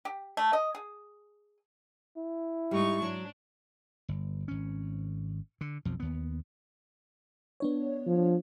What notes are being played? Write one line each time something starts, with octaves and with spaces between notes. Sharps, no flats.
G4
A3
D#5
G#4
E4
G#2 G3 D#4 C#6
F#3 D4
G1
G#1 C#4
D3
B1 F2 F3
D#2 B3
B3 D4 C#5
F3